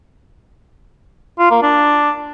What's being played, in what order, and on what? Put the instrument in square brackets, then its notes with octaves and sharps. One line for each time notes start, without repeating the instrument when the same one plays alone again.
[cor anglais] F4
A#3
D4